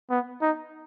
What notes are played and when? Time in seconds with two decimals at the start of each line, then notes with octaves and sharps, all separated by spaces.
0.10 B3
0.42 D#4